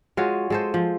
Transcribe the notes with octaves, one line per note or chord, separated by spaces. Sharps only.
G#3 F4 F#4 C#5
G#3 A4 C5
F3